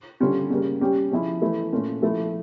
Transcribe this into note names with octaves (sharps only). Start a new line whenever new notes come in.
D3 G3 C#4 F4
C#3 G3 A#3
G3 C#4 G4
C#3 F3 C#4 E4
E3 A3 E4
A#2 A3 C#4 F4
F3 A3 E4